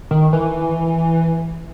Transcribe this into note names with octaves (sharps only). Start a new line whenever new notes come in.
D#3
E3